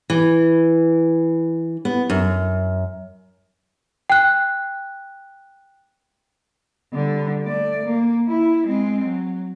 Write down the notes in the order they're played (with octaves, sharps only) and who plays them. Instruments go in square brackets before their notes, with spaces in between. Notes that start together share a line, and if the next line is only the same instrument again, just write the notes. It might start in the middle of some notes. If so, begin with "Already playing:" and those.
[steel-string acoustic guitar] E3
B3
F#2
[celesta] G5 F#6
[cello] D3 G3
A3 D5
A#3
E4
G#3 C4
F#3